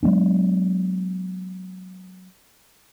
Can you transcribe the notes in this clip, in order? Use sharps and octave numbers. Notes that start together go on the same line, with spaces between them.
F#3 G#3 B3 D4